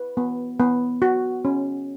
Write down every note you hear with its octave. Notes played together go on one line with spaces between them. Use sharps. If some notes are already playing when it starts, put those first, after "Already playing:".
Already playing: B4
B3
B3
F#4
C#4